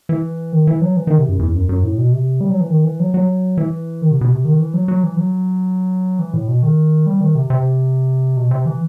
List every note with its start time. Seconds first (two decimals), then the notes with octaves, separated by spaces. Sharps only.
0.09 E3
0.53 D#3
0.67 E3
0.81 F#3
0.96 E3
1.07 D#3
1.18 C3
1.29 F#2
1.39 E2
1.54 F#2
1.69 F#2
1.84 A2
1.98 B2
2.12 C3
2.41 G3
2.50 F#3
2.61 E3
2.70 D#3
2.85 E3
3.00 F#3
3.14 F#3
3.58 E3
4.02 D#3
4.11 C3
4.21 B2
4.31 C3
4.45 D#3
4.60 E3
4.74 F#3
4.88 F#3
5.03 E3
5.17 F#3
6.19 E3
6.34 A2
6.48 B2
6.63 D#3
7.06 G3
7.21 D#3
7.35 C3
7.50 C3
8.37 B2
8.51 C3
8.66 E3